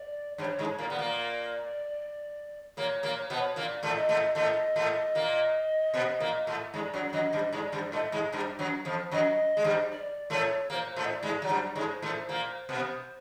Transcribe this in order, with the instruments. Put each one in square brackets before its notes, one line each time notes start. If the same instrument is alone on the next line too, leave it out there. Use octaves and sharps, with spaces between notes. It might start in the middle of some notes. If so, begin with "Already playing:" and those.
Already playing: [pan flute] D5
[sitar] G2 G3 [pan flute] C#5
[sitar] G#2 G#3
[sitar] A#2 A#3 [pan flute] D5
[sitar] B3
A#2 A#3
[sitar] A#2 A#3 [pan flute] C#5
[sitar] A#2 A#3
[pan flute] C#5
[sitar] B2 B3 [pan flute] C5
[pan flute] C#5
[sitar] A#2 A#3 [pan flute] D5
[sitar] A2 A3
[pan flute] D#5
[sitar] A2 A3
[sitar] A2 A3 [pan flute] D#5
[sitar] A2 A3
A#2 A#3
B2 B3
A#2 A#3
A2 A3
[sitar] G#2 G#3 [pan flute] D5
[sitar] F#2 F#3
[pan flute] D5
[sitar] F#2 F#3 [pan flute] D#5
[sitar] G2 G3
[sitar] G#2 G#3 [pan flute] D5
[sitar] G2 G3
[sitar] A2 A3 [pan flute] D#5
[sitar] G#2 G#3
G2 G3
F#2 F#3
F2 F3
[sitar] F#2 F#3 [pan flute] D#5
[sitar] G#3
G2 G3
[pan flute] D5
[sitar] A2 A3 [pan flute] C#5
[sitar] A#2 A#3 [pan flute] C5
[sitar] A2 A3
[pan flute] D#5
D5
[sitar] G#2 G#3
F#3
[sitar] G2 G3 [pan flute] D5
[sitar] G#2 G#3
[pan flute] C5
[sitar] A2 A3
[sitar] A#2 A#3 [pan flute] C5
[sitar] B2 B3